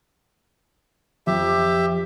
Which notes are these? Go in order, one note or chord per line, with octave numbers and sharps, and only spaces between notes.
F2 G4 E5